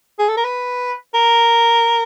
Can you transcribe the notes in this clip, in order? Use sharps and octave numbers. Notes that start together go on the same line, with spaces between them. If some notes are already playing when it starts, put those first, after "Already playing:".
G#4
A4
A#4
B4
A#4